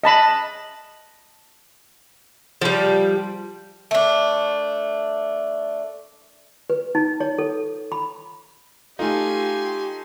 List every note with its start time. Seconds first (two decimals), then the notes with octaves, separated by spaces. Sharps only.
0.04 D#5 A5 B5
2.61 F3 G3
3.91 A3 D4
6.70 B4
6.95 D#4
7.20 C#5
7.38 A4
7.92 B5
8.99 A3 D#4 F4 G4 A4 F5 G#5 C6